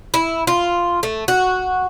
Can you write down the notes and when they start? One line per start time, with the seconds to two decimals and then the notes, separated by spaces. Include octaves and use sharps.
0.14 E4
0.47 F4
1.03 A3
1.28 F#4